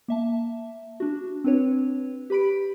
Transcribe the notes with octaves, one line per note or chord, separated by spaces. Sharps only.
A#3 E5 A5
D4 F#4
C4 D4 B4 C#5
G4 B4 B5 B6 D7